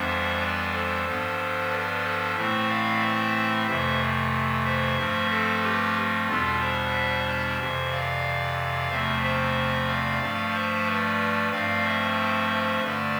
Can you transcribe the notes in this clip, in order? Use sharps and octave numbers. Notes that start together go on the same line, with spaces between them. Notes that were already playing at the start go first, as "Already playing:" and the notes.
Already playing: F2 E3 G3 B3 D4 C5 E5
B4 D5
A4 C5
G2 F3 B3 D4
B4 D5
A4 C5
A2 E3 A3 C4 C5 E5
D5 F5
C5 E5
F2 C3 E3 A3 C5 E5
C5 E5
G2 F3 A3 C4
A4 C5
G4 B4
E2 B2 G3 B3 D4 F4 A4
C5 E5
F2 C3 E3
D5 F5
E2 C3 F3 A3 C4 C5 E5
C5 E5
D5 F5
G2 F3 A3
C5 E5
B4 D5
G2 F3 A3 C4 D5 F5
C5 E5
C5 E5
G2 D3 A3 B4 D5